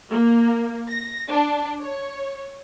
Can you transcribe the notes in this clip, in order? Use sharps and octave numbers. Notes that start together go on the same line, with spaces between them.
A#3
A#6
D4
C#5